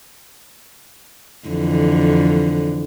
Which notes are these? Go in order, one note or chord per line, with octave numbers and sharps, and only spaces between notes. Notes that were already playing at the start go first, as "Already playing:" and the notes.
F2 D3 E3